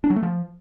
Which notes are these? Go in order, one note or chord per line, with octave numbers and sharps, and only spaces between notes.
D4
F#3
A3
F3